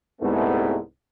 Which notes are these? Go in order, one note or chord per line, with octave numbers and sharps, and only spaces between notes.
C2 G#2 A3 B3